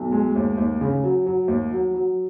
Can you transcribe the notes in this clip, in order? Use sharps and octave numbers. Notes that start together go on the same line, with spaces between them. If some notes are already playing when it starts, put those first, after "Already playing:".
Already playing: B1
G#3
D#2
D#2
C#3
F#3
F#3
D#2
F#3
F#3